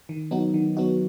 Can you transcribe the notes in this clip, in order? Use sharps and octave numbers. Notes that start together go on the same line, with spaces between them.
D#3
F#3 B3 D#4 F#4
D#3
F#3 B3 D#4 F#4